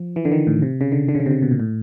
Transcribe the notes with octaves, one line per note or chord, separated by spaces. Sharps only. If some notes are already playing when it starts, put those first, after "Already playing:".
Already playing: F3
E3
D3
D#3
A2
C3
C#3
D3
D3
C#3
D3
C3
C#3
B2
A#2
A2